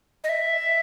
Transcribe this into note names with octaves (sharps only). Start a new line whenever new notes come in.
D#5
E5